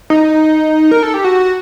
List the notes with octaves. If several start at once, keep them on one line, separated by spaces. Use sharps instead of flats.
D#4
A#4
A4
G4
F#4